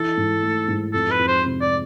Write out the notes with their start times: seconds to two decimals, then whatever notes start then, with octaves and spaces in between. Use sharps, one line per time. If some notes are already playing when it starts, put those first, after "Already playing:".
Already playing: E3 A4
0.17 G#2
0.43 A3
0.68 G#2
0.94 F2 A4
1.11 B4
1.19 F2
1.28 C5
1.45 C3
1.61 D5